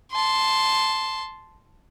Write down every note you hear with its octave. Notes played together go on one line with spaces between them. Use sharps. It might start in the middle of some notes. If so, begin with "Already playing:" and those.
A5 C6